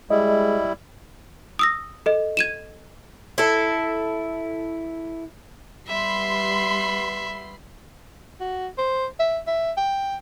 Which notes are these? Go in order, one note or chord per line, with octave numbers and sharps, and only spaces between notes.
G3 G#3 E4 D#5
D#6 E6 A#6
A4 D#5
G#6 D#7 E7
E4 A4
G3 B3 E5 B5 C6 C7
F#4
C5
E5
E5
G5